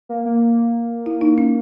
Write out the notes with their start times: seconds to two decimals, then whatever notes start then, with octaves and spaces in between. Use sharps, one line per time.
0.09 A#3
0.25 A#3
1.06 E4
1.21 D#4
1.38 C#4